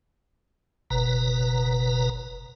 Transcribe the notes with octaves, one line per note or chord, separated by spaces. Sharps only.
F#1 B2 B4 A#5